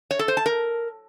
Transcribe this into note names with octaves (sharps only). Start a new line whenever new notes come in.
C#5
A4
C5
A5
A#4